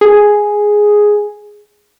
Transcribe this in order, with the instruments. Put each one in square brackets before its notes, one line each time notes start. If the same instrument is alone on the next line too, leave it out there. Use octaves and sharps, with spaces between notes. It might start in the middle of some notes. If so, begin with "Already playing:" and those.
[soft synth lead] G#4